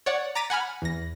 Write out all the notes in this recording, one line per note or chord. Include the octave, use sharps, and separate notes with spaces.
C#5 D5 F#5
A#5 D6 A6 B6 D#7
F#5 G#5 B5 F6
E2 A#6